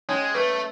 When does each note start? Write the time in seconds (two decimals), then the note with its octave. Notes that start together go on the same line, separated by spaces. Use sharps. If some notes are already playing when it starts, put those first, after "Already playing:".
0.09 G#3 C#4 C#5
0.34 A3 B4